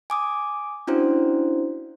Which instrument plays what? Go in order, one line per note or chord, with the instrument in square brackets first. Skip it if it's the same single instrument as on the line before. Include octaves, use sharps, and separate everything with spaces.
[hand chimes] G#5 D6 D#6
C#4 D4 E4 F#4 C5